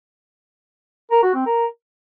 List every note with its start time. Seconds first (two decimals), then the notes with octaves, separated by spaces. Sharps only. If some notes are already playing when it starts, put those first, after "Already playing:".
1.11 A#4
1.23 F#4
1.34 C4
1.46 A#4